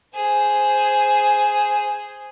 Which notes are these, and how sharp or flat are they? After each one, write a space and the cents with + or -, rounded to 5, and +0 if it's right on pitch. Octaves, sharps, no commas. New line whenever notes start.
G#4 +0 C5 +0